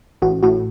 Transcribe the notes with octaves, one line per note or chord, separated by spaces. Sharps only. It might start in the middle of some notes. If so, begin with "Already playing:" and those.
A1 F#4
A2 F#4